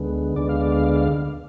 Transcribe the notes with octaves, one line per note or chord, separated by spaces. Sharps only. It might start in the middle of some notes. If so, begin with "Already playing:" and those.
Already playing: D2 D3 G#3 B3
D2 D3 G#3 B3 D5
F5
D5
F5
D5
F5